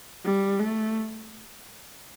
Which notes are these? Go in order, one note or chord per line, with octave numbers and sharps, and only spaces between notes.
G3
A3